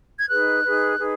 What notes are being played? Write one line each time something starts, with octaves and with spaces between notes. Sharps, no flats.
G#6
D#4 G#4 B4 F#6
D#4 G#4 B4
D#4 G#4 B4